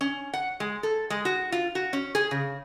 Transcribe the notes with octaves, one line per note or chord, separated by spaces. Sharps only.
C#4
F#5
G#3
A4
G#3
F#4
F4
F#4
C#4
G#4
C#3